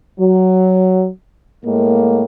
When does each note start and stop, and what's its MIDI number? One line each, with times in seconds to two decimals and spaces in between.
0.20 1.08 54
1.65 2.24 45
1.65 2.24 56
1.65 2.24 58